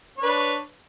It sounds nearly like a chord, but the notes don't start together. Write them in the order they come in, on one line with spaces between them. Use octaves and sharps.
C#5 D4 B4